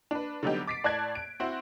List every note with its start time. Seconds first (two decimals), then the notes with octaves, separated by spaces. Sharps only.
0.11 D4 B4
0.43 D3 F#3 G3 B3 D#4 G4
0.67 D6 A6 B6 C7 D7
0.84 A2 D5 A5 F#6 G#6 D7
1.15 D7
1.40 C4 E4 F#4 C5